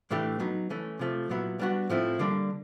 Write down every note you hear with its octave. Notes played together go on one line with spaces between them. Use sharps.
A2 E3 A3 D4 G4
F#3 B3 D#4
E3 A3 C#4
C3 F3 A3
A#2 F#3 B3 E4
G3 B3 D4 F#4
A2 F3 A3 C4 E4
D3 G3 A#3 D4